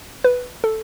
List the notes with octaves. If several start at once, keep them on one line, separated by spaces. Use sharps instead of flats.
B4
A4